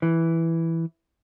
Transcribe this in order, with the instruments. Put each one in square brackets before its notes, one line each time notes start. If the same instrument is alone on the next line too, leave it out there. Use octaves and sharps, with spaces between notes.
[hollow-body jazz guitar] E3